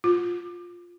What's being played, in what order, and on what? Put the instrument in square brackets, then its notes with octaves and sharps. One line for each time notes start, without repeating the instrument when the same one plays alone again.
[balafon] F4